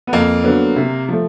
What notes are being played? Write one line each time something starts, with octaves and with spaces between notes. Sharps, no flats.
B3
F2 A#3
D3 F#3 B3
C3
F3 A3